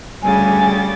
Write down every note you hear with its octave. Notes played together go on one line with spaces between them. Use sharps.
D2 C#3 G3 G#5 A6